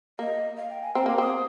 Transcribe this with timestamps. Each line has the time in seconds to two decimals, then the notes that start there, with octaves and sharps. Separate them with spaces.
0.19 A#3 D#5
0.57 F5
0.70 G5
0.82 G#5
0.95 C4 A#5
1.06 A#3 D6
1.18 C4 D#6